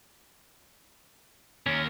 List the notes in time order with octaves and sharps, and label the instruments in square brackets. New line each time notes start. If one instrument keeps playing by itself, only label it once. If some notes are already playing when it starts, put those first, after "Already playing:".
[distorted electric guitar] D#2 A#4 [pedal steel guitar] C#4